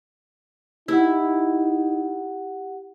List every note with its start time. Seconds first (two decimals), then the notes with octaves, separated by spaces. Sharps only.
0.88 D#4 E4 G4 F#5